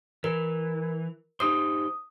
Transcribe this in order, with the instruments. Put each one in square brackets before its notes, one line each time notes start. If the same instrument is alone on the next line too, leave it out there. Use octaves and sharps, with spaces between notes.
[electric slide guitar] E3 [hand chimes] A#4
[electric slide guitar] D#4 G4 C5 [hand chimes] D#6